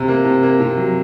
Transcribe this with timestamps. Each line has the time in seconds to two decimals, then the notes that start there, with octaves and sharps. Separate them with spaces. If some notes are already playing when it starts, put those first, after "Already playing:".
Already playing: C3
0.08 A#3
0.25 C3
0.43 A#3
0.60 C3
0.77 F#3